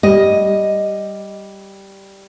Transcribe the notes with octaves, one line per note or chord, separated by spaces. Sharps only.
G3 D#5